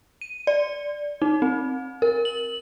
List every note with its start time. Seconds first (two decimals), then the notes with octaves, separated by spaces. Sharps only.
0.21 D#7
0.47 D5
1.22 D#4
1.42 C4
2.02 A#4
2.25 F#7